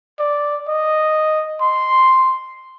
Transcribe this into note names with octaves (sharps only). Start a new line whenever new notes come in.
D5
D#5
C6